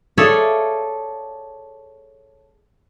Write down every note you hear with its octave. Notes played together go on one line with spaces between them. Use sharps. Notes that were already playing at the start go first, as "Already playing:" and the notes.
G#4 A4 C#5 D5 E5 F5